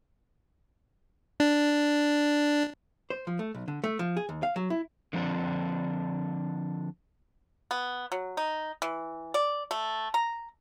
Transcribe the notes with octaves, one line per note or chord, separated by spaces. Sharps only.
D4
C5
F3
A3
B1
D3
A3
F3
G#4
D#2
F5
F#3
E4
D3 F3 C4 D4
B3
F#3
D#4
E3
D5
A3
A#5